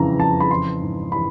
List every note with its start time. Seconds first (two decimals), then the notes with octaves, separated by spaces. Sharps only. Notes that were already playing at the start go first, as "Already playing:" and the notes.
Already playing: F2 C#3 E3 A#5
0.19 F2 A5
0.40 B5
0.51 E3 C6
0.81 G#2
1.12 E3 B5